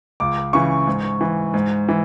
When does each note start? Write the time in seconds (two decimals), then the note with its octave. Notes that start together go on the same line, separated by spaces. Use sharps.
0.20 C#2 D6
0.53 C#3 E3 C#6
0.87 G#2
1.21 E3
1.54 G#2
1.89 E3